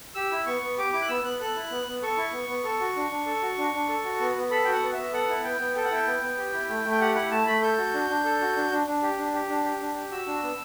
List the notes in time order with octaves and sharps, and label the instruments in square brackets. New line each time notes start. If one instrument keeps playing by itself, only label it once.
[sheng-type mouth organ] G4 E6
E4
B3 C#6
B3
G4 D6
E4 D6
F#6
B3 E6
B3 F#6
A4 F#6
E4
B3
B3
A4 C#6
E4
B3
B3
A4
F#4
D4
D4
A4
F#4
D4
D4
A4
F#4
B3
B3
A4 B5
F#4 G5
F#5
B3
B3 E5
A4 F#5
E4
B3 G5
B3
A4 G5
F#5
E4 G5
B3
B3
G4
E4
A3
A3
G5
G4 F#5
E4 F#5
A3 A5
A3 B5
A4 G6
F#4
D4
D4
A4
F#4
D4
D4
D4
G4
D4
G4
D4
G4
D4
G4
F#4 E6
D4
B3